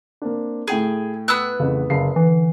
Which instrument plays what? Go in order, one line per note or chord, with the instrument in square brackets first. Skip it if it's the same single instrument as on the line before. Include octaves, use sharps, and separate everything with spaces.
[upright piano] A#3 C4 D4
[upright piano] A2 G5 D#7 [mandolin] G#4
[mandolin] B3 E6 F#6
[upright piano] A1 F2 [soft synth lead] C#3
[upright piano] F#1 F5 C7 [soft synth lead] C#3
[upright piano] D3 [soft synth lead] E3